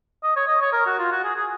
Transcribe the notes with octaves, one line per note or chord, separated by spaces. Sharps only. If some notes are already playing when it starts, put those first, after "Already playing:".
D#5
C#5
D#5
C#5
A#4
F#4
F4
F#4
G#4
G#4